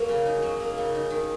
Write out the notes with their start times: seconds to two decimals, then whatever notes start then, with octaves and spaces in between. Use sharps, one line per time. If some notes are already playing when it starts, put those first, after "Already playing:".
Already playing: F#3 A#3
0.08 C#3
0.26 D#4
0.42 F#3
0.60 A#3
0.78 C#3
0.95 D#4
1.10 D#3